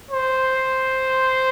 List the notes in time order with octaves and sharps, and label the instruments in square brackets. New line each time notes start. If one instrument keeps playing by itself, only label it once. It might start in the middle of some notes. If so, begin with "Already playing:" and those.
[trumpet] C5